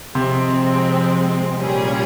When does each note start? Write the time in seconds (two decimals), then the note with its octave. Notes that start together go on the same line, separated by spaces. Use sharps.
0.15 C3 F3 G#3 C4
1.58 A#2 G3 C#4 G#4